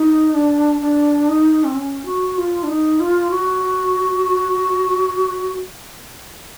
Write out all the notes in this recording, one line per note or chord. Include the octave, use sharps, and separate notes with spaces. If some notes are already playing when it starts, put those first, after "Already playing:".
Already playing: D#4
D4
D4
D#4
C4
C#4
F#4
F4
D4
D#4
F4
F#4